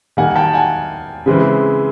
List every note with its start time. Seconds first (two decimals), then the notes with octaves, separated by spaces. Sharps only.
0.17 D#3 G3 A#3 F#5 G#5
0.36 G5 A5
0.53 F#5 G#5
1.26 C#3 E3 G#3 C4